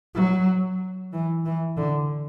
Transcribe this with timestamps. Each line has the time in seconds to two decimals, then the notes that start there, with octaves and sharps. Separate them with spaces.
0.15 F#3
1.13 E3
1.45 E3
1.77 D3